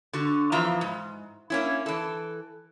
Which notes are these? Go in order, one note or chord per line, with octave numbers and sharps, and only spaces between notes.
D3 F#4
E2 E3 F3 F4 E5 A#5
G#2
A#3 C#4 E4
E3 A4